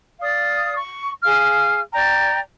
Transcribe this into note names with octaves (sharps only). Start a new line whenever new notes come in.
D5 F5 D#6
C#6
G#4 F5 F6
D5 G5 A#5